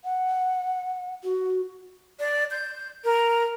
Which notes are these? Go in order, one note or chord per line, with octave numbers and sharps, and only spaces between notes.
F#5
F#4
D5
G6
A#4